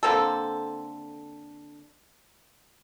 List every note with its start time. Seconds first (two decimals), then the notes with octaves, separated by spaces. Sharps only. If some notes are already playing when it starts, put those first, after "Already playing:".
0.03 D3 A#3 C4 A4